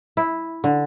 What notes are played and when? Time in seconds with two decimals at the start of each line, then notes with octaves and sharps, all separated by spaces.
0.17 E4
0.64 D3